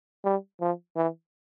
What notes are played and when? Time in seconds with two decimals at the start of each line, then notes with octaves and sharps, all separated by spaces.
0.25 G3
0.61 F3
0.96 E3